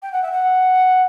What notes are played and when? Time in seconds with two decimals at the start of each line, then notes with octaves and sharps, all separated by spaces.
0.02 G5
0.12 F#5
0.22 E5
0.32 F#5